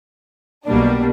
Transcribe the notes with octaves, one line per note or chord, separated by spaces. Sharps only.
B1 B2 G3 A#3 D4